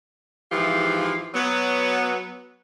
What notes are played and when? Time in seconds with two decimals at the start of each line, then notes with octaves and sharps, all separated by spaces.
0.51 G#2 E3 F3 G4 F5
1.34 F#3 B3